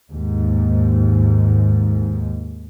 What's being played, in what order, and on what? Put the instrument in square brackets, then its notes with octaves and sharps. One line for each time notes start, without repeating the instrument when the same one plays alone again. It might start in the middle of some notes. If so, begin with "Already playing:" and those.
[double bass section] D#2 G#2